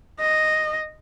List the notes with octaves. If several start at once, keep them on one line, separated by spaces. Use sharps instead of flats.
D#5